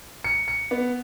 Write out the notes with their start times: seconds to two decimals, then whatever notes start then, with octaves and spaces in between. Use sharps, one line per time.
0.24 C#7
0.48 C#7
0.71 B3